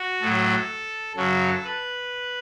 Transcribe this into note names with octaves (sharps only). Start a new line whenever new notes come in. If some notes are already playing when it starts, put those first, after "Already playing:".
Already playing: F#4
A2 F#3 A4
F#2 C#3 F#3 A4
B4